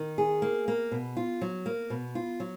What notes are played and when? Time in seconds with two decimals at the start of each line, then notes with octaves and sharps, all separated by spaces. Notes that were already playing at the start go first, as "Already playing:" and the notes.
Already playing: D#3
0.18 G#4
0.42 A#3
0.68 A#3
0.91 B2
1.17 F4
1.42 F#3
1.66 A#3
1.90 B2
2.15 F4
2.40 F#3